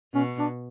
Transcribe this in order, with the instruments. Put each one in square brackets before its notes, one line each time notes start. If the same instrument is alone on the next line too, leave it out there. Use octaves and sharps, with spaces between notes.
[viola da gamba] B2 [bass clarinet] C#4
[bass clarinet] D4